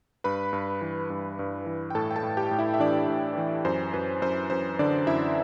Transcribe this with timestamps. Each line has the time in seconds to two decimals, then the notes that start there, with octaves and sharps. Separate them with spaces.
0.24 G2 B4 B5
0.53 G2
0.81 E3
1.10 G2
1.39 G2
1.66 E3
1.90 G5
1.95 A2 A4 A5
2.11 G5
2.16 A4 A5
2.23 A2
2.37 G4 G5
2.51 A2
2.59 E4 E5
2.74 E5
2.80 E3 D4 D5
3.08 A2
3.38 E3
3.65 F#2 C5
3.93 F#2 B4
4.22 F#2 C5
4.50 F#2 C5
4.79 D3 D4 D5
5.07 F#2 E4 E5